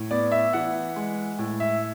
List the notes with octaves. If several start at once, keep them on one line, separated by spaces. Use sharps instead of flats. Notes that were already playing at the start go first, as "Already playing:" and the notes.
Already playing: A2
B3 D5
E5
E3 F#5
G#3
A2
E5